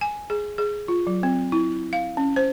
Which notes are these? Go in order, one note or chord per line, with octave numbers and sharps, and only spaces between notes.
G#5
G#4
G#4
F4
F#3
C4
E4
F5
C#4
C5